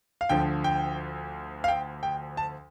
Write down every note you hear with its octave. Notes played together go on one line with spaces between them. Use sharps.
F5
D2 D3 F3 G5
G5
F5
G5
G5
A5